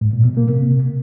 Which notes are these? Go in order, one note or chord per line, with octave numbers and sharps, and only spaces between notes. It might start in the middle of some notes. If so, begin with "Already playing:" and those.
G#2
A#2
B2
A#3
C3